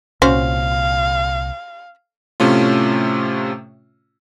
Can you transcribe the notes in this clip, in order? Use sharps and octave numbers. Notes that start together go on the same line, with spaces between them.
C2 A#2 C#4 F#4 C5 F5
A2 C3 A3 C#4 F4